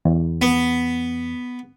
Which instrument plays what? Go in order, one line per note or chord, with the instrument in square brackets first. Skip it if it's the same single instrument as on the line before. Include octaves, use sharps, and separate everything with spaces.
[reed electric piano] E2
[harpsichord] B3